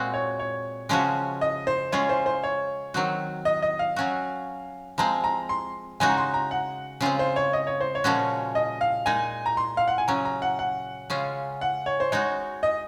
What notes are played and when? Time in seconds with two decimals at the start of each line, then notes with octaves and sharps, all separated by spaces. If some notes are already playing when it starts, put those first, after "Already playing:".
Already playing: A#2 G#3 C4 F#4
0.14 C#5
0.39 C#5
0.89 C#3 F3 G#3 C#4 F#4
1.41 D#5
1.67 C5
1.92 G#3 C#4 F4 G#4 C#5
2.09 C5
2.26 C5
2.43 C#5
2.94 D#3 F#3 C4 F#4
3.45 D#5
3.62 D#5
3.79 F5
3.96 F#3 C#4 F#4
4.98 F3 G#3 C4 A#5
5.24 A#5
5.49 C6
6.00 C#3 G#3 D#4 F#4 G#5
6.09 A#5
6.17 C6
6.34 A#5
6.51 F#5
7.01 C#3 G#3 C4 F4
7.19 C5
7.36 C#5
7.53 D#5
7.67 C#5
7.81 C5
7.95 C#5
8.04 A#2 F3 G#3 C#4 F#4
8.55 D#5
8.81 F5
9.06 A#2 G#3 D#4 G#5
9.46 A#5
9.57 C6
9.77 F5
9.88 F#5
9.98 G#5
10.08 C#3 F#3 C#4 A#5
10.25 A#5
10.42 F#5
10.59 F#5
11.10 C#3 G#3 C#4 F4
11.61 F#5
11.86 C#5
12.00 C5
12.12 G#3 D#4 F#4 C#5
12.63 D#5